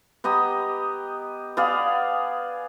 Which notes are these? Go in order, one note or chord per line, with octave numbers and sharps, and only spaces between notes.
B3 G4 D#5 A#5
B3 G#4 D5 F5